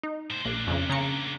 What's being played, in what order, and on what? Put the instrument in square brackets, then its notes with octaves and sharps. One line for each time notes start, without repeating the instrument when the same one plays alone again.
[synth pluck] D#4
[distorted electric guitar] A2 C5
[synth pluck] A#1 [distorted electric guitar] A#3 D4
[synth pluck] F2 C#3
C#3 A#5 C#7